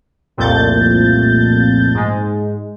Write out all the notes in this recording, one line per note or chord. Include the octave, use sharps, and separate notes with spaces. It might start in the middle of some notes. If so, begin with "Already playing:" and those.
C2 F2 A#2 A3 G6 A6
G#2 G#3